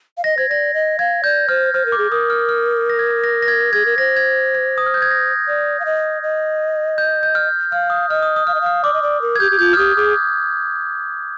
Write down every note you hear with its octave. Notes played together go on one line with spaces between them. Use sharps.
F5
D#5 A#6
C5 G#6
D5 A#6
D#5
F5 G#6
D5 G6
C5 F6
C5 F6
A#4
D6
G#4
A#4 D#6
F6
F6
A#6
G#6
A#6
A#6
G#6
G#4 G#6
A#4
C5 A#6
G#6
G#6
D#6
F6
G6
G#6
A#6
D5
F5
D#5
D#5
G6
G6
F6
F5 F6
D#6
F6
D#5 F6
D#6
D#6
F5 F6
D#5
F5
F6
D5 D6
D#5
D5
A#4
G#6
G4 G6
G4
F4 G6
F6
G4 D#6
G#4 D6